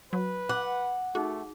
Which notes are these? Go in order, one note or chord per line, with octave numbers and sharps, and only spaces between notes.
F#3 B4
F#5 D6
A3 D#4 F#4 G#4